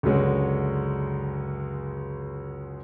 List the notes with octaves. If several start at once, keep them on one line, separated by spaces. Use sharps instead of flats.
C#2 F#2 D3 F#3 G#3